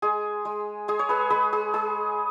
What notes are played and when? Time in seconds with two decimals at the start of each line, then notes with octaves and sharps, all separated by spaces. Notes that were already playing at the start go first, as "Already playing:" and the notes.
0.02 G#3 G#4
0.45 G#3
0.88 G#3 G#4
0.99 C#5
1.09 G#4 B4
1.30 G#3 G#4 B4
1.53 G#4
1.74 G#3 G#4